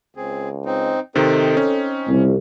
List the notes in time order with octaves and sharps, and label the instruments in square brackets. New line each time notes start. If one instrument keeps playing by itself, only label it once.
[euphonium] C#2 [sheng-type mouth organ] C4 G#4
[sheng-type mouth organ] C4 D#4
[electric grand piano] C3 D#3 [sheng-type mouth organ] C4 D#4 [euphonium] A4
[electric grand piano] C#4
[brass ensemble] C2 [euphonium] F2